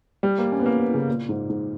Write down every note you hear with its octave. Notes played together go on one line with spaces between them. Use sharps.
G3
A#3
C#4
B3
A#3
B3
C#3
A#2
G#2
G#2